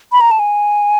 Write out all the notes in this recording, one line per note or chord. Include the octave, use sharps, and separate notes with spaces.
B5
A#5
A5
G#5